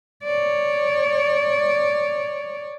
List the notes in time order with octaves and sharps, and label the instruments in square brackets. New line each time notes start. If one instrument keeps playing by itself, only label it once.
[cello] C#5 D5